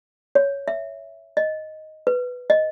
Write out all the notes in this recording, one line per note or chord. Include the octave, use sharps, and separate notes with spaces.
C#5
E5
D#5
B4
D#5